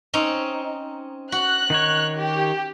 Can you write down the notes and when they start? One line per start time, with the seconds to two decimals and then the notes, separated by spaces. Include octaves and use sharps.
0.14 C4 C#4 D#4
1.32 F#4 F#6
1.70 D#3 D#4 C#5
2.18 G4